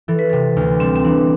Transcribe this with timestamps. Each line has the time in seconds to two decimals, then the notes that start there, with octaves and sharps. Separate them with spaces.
0.08 E3 A4
0.19 B4
0.30 C3 A4
0.56 D2
0.80 G3 C4
0.96 C4
1.04 E3 D4